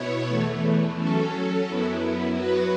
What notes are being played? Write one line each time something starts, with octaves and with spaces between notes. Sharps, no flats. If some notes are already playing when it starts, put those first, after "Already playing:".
Already playing: B2 B3 E4 C#5
E2 E3 A3
F#3 C#4 A4
F#2 F#3 B3 E4
F#3 B3 F#4 B4